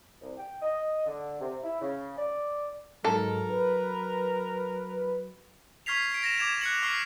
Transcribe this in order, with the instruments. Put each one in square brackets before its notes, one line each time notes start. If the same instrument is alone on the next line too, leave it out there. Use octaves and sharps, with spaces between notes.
[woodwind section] C2
G5
D#5
D3
C3
E4
C#3
D5
[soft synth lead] G#2 [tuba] F#3 [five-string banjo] A4 [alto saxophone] A#4
[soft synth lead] B4
[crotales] C#6 F6 G#6 B6 C7 F7
B6 D7
A#6 E7
D6 G#6 E7 F7
F#6 C#7 F#7
C#6 F6 C7